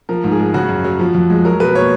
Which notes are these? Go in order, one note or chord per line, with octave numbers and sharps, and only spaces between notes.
F3 A#4
G#2
G#4
G#3
C#3 F#4
F#2
F#3
F3
F2
G#3
F#3 A#4
B2 B4
A#3 C#5